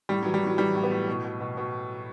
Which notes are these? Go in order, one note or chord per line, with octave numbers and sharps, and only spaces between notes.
A2 G3
E3 F#3
G3
A2 F#3
E3 G3
A2
B3
A2
B2
B2
B2
B2